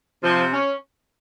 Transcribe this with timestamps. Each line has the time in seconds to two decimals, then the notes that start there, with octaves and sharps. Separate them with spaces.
0.23 C3 F3
0.53 C#4